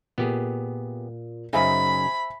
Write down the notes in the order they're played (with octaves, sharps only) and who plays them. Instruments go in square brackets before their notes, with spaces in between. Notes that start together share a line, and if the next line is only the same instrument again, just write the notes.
[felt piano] A#2 [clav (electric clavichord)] B3 G4 G#4
[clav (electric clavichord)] F#2 C#3 D#4 [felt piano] C5 E5 G#5 [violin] B5